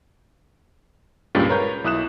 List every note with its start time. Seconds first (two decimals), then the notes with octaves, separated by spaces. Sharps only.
1.35 C#2 G2 A#2 C#3 G4 A6
1.49 A#4 B4 C#5 A#5 G6
1.84 B1 E4 D#6 F#6 E7